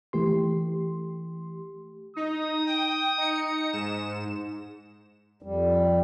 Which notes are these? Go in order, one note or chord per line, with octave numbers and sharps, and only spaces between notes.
E3 A3 G4 C6
D#4 D#6
G5
D#4 C#7
G#2 E7
F2 G3